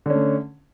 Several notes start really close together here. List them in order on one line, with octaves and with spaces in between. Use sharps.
D3 C#4 A3